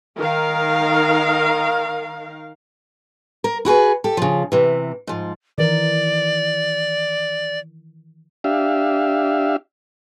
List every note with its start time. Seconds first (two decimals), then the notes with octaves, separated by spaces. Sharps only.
0.17 D#3 A#4 F5
3.44 A#4
3.65 E4 F#4 G#4 B4
4.04 G4 A4
4.17 C#3 F3
4.52 C3 E3
5.07 G#2 F3
5.58 D#3 E3 A#4 D5
8.44 D4 G4 E5 F5